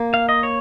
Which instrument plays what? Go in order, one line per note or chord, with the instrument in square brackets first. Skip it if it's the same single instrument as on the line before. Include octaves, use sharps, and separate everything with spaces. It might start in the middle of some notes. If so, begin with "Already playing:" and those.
Already playing: [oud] A#3
[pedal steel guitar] F5
D#5
C#5